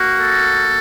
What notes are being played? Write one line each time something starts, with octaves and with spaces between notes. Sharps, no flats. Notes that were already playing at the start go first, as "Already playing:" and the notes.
Already playing: A#3 F#4
A4